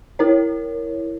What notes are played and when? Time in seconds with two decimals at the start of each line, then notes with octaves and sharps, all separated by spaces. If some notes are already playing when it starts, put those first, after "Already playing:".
0.19 E4 A#4 C#5